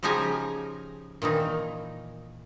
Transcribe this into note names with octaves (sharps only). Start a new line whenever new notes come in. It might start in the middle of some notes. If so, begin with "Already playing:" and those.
C#3 F3 D#4 G4 G#5 A#5
A#2 D#3 E3 D#4